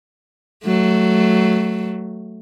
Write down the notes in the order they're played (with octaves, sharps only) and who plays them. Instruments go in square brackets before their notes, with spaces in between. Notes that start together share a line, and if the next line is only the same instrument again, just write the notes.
[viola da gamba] F#3 A3